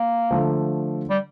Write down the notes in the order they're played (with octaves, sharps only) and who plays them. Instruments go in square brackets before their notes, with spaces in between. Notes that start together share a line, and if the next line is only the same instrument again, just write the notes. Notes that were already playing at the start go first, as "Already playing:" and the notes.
Already playing: [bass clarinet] A#3
[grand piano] D3 F3 A3
[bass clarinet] G3